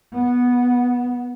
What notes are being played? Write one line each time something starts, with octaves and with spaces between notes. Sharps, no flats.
B3